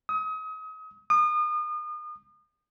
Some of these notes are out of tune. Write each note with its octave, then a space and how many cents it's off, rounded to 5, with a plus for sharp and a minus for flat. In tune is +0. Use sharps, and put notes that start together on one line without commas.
D#6 +35
D#6 -35